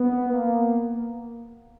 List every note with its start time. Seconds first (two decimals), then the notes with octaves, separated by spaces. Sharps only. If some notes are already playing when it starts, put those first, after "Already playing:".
Already playing: B3
0.32 A#3